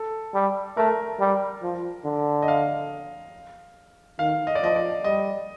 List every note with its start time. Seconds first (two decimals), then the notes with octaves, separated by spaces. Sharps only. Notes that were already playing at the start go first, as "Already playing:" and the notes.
Already playing: A4
0.34 G3
0.77 A3 A#4
1.20 G3
1.63 F3
2.05 D3
2.42 D#5
2.48 F5
4.19 D#3 F5
4.47 D#5
4.55 D5
4.62 F3 D#5
4.76 D5
5.04 G3 D#5